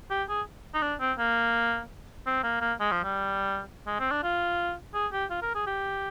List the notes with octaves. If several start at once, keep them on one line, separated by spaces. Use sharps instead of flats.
G4
G#4
D#4
D4
C4
A#3
C4
A#3
A#3
G#3
F3
G3
G#3
C4
D4
F4
G#4
G4
F4
A#4
G#4
G4